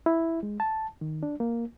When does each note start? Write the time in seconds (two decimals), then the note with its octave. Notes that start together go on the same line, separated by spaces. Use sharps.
0.06 E4
0.43 G#3
0.60 A5
1.01 D#3
1.23 D4
1.40 A#3